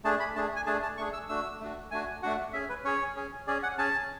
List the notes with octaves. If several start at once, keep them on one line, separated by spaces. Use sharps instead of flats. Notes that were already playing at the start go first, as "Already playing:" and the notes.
A3 D4 G#4 A5
B5
A3 D4 G#4 A5
G#5
A3 D4 G#4 A5
A5
A3 D4 G#4 C#6
E6
A3 D4 F#4 E6
A3 D4 F#4
A3 D4 F#4 G#5
A3 D4 F#4 F#5
C#4 G#4 E5
B4
C#4 G#4 C#5
C#4 G#4
C#4 G#4 D5
F#5
C#4 G#4 A5